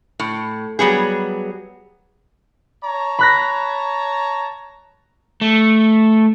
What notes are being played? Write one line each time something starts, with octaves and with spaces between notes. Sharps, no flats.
A2
F#3 G3 B3 G#4
C#5 A5 A#5
B5 F#6 A#6
A3